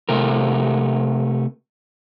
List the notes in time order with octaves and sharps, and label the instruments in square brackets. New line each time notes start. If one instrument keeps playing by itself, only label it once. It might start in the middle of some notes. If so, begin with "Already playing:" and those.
[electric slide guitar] C3 A3 A#4